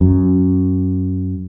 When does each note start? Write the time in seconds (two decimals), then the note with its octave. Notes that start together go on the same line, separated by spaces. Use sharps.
0.01 F#2